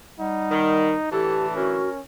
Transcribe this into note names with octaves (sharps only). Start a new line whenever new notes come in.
G3 D#4 F#5
D#3
A2 D3 E3 G4 A4 A5
C#4 F#4 A#4